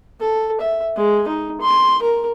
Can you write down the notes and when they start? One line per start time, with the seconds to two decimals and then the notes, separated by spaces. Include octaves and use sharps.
0.20 A4
0.61 E5
0.97 G#3
1.28 D#4
1.61 C6
2.03 A#4